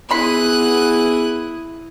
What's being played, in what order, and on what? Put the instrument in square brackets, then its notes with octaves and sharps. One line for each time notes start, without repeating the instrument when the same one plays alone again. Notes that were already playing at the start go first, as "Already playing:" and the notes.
[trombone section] B3 G#4 [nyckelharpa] E4 D#6 [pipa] B5 C6 [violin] F#6 D#7